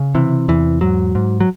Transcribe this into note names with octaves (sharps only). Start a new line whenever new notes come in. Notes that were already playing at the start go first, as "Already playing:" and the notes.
Already playing: C#3
C3 E3
E2 E3
G#2 F#3
G#2
F#3